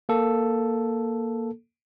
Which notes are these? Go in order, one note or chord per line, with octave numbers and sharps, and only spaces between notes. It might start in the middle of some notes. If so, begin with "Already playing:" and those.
A#3 A4